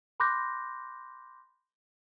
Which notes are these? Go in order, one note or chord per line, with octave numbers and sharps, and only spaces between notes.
B5 C6 D6 F#6 G6 A#6